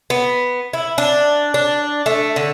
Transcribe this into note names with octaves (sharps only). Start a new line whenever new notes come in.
B3
E4
D4
D4
A3
D3